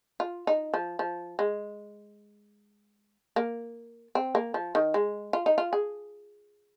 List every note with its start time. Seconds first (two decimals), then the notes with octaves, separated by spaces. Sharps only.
0.20 F4
0.47 D#4
0.74 F3
0.99 F3
1.39 G#3
3.36 A#3
4.15 C4
4.35 A#3
4.54 F3
4.75 D#3
4.94 G#3
5.33 F4
5.46 D#4
5.58 F4
5.73 G#4